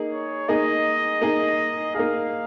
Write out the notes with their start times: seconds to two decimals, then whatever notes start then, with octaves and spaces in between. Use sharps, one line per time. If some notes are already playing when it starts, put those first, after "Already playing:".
Already playing: A#3 D#4 G#4
0.12 C#5
0.48 A#3 D#4 G#4 D#5
1.21 A#3 D#4 G#4
1.95 A#3 D#4 G#4 F5